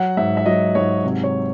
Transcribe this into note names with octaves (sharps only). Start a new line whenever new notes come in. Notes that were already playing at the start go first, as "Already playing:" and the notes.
Already playing: F#3 F#5
G#2 E5
E5
F#3 D#5
G#2 C#5
C3
C#5